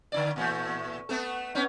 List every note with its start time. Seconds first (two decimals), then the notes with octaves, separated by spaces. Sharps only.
0.12 D3 D#4 D5
0.36 A#2 E3 A3
1.09 A3 B3 A4
1.55 B3 C#4 D#4